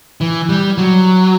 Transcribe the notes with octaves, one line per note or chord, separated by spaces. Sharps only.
E3
G3
F#3